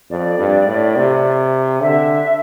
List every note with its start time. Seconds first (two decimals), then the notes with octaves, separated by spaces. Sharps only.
0.10 F2 D5
0.39 G2
0.68 A2
0.96 C3
1.81 D3 E5